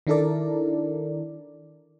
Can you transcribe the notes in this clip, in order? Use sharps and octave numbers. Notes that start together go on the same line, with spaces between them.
D#3 D4 E4 A4 A#4 D5